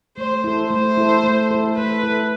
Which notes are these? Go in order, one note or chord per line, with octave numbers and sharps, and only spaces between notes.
A3 C5
E4 A4
A3 C5
E4 A4
A3
E4 A4
A3 B4
E4 A4